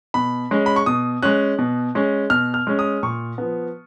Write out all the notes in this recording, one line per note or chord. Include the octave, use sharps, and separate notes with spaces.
B2 B5
G#3 C#4
B5
C#6
B2 D#6
G#3 C#4 F#6
B2
G#3 C#4
B2 F6
F6
G#3 C#4
D#6
A#2 C#6
F3 B3